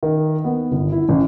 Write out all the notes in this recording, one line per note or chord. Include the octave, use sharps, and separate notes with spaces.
D#3
B3
G1
E4
A1